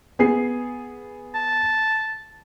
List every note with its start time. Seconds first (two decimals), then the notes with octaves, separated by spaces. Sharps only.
0.19 B3 G#4 C7
1.35 A5